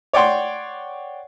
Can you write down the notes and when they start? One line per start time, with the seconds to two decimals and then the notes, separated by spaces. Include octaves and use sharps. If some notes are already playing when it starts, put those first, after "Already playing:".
0.13 C#5 D5 F#5 G5 C6 D6